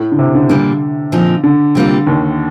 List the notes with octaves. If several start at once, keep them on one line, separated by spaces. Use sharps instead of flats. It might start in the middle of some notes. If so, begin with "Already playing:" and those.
Already playing: A2 A3
D3
C3
D3
A#2 D3 G3 A#3
A#2 F3 C4 D#4
D3
C3 G3 A#3 F4
D#2 D#3